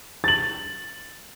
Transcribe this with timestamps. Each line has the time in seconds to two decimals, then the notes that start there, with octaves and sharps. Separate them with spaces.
0.24 A6 F#7